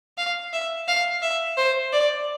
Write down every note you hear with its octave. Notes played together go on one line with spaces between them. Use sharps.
F5
E5
F5
E5
C5
D5